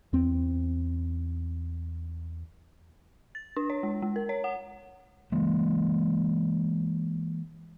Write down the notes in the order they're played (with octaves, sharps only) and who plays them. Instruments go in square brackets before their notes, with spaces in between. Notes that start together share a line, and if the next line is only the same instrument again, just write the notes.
[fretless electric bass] E2 C4
[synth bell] A6
D4
C#5
G#3
G#3
A#4
C#5
F#5
[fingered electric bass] E3 G#3 A#3